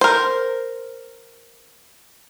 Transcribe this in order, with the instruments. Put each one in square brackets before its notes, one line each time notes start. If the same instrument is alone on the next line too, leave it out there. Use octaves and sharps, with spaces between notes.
[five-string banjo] A#4 C5